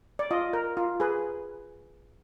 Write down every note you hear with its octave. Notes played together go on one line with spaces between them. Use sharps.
D5
F4 D#5
A#4
F4
G#4 B4